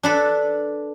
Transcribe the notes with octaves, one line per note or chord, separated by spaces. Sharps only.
D4 A4 B4